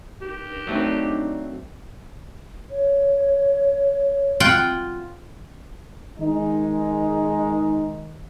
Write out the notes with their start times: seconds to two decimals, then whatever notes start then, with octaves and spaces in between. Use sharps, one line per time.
0.21 G4
0.67 F#3 A3 C4 D4 D#4
2.70 C#5
4.40 F4 F#5 G5
6.18 D#3 G#3 D#4